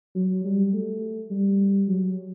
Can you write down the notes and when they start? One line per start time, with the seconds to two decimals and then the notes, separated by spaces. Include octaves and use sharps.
0.15 F#3
0.45 G3
0.73 A3
1.30 G3
1.88 F#3